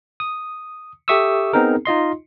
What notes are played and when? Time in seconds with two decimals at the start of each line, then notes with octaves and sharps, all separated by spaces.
0.20 D#6
1.08 G4 A4 E5 C#6 D#6 E6
1.53 B3 C4 D#4 G#4 A#4
1.85 D#4 F4 D#5 C6